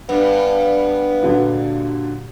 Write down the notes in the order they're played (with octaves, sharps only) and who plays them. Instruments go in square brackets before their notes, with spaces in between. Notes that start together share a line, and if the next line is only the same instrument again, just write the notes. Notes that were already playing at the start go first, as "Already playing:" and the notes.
[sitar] G2 [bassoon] B3
[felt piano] A#2 D3 F#3